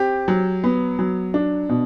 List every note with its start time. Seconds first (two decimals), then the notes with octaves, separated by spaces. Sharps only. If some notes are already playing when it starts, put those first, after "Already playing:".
Already playing: C4 G4
0.28 F#3
0.64 B3
0.99 F#3
1.34 D4
1.69 B2